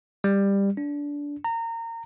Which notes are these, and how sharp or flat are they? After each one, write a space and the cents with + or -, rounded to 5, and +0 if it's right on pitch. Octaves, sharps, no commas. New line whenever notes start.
G3 +15
D4 -20
A#5 -25